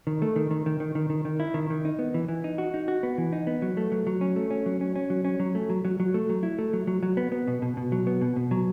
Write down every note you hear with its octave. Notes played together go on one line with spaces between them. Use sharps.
D#3
A3
D#3
D#3
D#3
D#3
D#3
D#3
D#3
E4
D#3
D#3
D#4
B3
E3
E3
D#4
F#4
D#4
F#4
B3
E3
D#4
B3
F#3
A3
F#3
F#3
C#4
A3
C#4
F#3
C#4
C#4
F#3
C#4
F#3
A3
F#3
F#3
F#3
A3
F#3
E4
A3
F#3
F#3
F#3
B3
B3
B2
B2
B2
F#3
B3
B2
B2
F#3